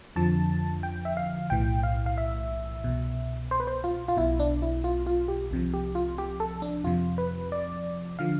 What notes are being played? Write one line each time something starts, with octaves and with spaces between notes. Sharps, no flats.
F2 D3 F3 A5
G5
E5
F5
B1 A2 E3 G5
F5
F5
E5
C2 B2
C5
B4
C5
F4
F4
B1 B2 E4
D4
E4
F4
F4
G4
C2 C3 F3
G4
F4
G4
A4
D4
F2 C3 F3 F4
B4
D5
D3 F3 F5